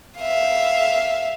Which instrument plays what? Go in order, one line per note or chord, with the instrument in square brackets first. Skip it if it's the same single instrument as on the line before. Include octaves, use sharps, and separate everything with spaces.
[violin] E5 F5